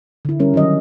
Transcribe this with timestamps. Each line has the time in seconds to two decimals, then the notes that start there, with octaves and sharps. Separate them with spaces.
0.25 D3 E4
0.40 G3 C#4 A#4
0.54 D#3 F#3 D#5